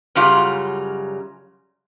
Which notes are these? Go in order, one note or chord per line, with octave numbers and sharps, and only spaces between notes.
F#2 C#3 F#3 G3 F4